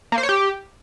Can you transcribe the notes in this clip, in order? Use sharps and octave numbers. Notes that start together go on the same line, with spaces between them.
A#3
C5
C#5
G4